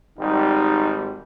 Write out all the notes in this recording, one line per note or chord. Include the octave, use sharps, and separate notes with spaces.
G#1 G3 D#4